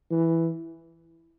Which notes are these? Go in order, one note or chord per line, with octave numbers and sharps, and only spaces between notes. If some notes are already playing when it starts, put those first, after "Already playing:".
E3